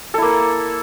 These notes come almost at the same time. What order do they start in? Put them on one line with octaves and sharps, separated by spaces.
A4 E4 A#3